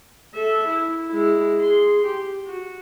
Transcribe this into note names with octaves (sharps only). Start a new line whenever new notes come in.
A4 E5
E4
G#3 E4
G#4 C6
G4
F#4